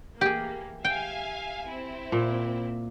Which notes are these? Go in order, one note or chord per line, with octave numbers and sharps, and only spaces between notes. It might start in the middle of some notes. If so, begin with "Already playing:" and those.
E3 A#3 G4 G#4
E5 F5 G5 G#5
C4 E4
A#2